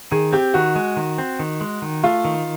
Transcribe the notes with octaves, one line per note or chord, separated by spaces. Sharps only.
D#3 G#4
C4 G4
D#3 F#4
G#3
D#3
C4
D#3
G#3
D#3
A3 F4
D#3